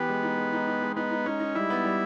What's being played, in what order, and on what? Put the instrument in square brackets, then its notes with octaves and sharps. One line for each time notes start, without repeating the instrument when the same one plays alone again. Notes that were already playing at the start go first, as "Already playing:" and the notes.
Already playing: [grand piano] E3 G4 [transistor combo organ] B3
[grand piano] G#3
D#4
G#3
D#4
D#4
G#3
[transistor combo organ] B3 [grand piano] D#4
[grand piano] D#4
[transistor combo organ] C#4 [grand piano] D#4
[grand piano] D#4
[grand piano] G3 [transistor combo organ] E4
[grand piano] B3
G3